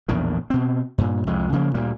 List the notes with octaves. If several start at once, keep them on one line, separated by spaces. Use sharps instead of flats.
A#1 E2 A2 D#3
B2 C4
G2 A#2
C2 F2 G#3
C#3 F3 A#3
D2 A#2 G3 A#3